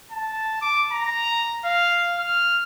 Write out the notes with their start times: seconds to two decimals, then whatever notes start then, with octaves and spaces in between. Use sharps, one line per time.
0.12 A5
0.61 D6
0.92 A#5
1.65 F5
2.18 F6